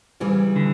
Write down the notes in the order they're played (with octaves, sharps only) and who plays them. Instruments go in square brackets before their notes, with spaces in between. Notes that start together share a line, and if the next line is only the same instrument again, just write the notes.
[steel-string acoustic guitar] D2 C#3 E3 G3
[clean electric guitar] D3